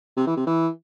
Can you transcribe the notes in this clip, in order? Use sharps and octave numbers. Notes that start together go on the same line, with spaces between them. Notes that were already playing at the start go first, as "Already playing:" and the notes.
C3
E3
C3
E3